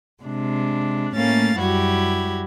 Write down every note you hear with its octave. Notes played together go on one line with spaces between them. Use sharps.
C3 G#3 D4
A2 A3 A#3 C#4 F5 A6
F#2 G3 E4 F#4 G4 G#6